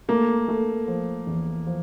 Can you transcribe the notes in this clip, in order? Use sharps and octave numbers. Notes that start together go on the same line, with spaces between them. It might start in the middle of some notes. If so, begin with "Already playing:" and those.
A3 A#3
A3
F3
E2
F3